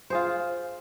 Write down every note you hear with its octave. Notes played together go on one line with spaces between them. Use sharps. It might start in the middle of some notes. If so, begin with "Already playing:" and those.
F4 G#4 C5